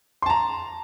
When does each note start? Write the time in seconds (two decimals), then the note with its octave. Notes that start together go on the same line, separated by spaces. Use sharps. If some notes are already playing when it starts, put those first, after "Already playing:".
0.22 C6
0.26 A5
0.30 A#5